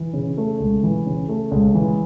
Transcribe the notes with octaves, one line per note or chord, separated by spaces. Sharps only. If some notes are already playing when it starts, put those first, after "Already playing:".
Already playing: E3
C#3
A3
C#2
E3
C#3
A3
C#2
E3